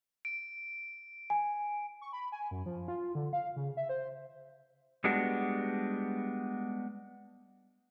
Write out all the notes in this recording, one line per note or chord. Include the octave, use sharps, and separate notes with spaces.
D7
G#5
C#6
B5
G#5
F#2
F3
F4
D3
F5
C#3
E5
C5
G3 G#3 B3 D4 F#4